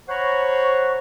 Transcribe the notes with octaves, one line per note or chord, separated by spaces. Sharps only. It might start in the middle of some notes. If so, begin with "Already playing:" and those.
C5 C#5 F#5 A#5 B5 C#6